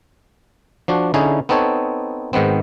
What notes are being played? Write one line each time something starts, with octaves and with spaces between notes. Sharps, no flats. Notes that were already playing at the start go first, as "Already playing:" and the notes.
F3 D4 F#4
D3 C#4 D#4 E4 G#4
B3 C4 D#4 A4 C#5
G#2 D#3 B3 C4